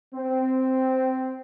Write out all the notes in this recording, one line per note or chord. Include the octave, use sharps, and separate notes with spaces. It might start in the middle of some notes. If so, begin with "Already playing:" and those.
C4